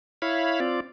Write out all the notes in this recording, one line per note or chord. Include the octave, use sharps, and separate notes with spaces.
E4 C#5 F5 B5
C4 F4 D5